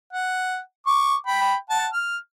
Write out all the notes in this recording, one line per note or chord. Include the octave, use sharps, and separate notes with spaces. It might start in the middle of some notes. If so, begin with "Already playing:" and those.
F#5
C#6 D6
G5 B5
F#5 A5
F6